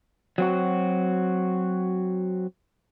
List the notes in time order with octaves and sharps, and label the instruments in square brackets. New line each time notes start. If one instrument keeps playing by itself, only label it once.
[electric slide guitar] F#3 C4 F#4